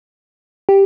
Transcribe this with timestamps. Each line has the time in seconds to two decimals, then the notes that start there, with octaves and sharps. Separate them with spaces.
0.69 G4